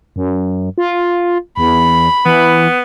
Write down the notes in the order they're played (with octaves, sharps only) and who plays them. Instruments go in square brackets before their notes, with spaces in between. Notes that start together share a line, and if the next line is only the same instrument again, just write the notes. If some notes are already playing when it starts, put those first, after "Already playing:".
[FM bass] F#2
F4
[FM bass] E2 [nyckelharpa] B5
[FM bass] E3 [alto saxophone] B3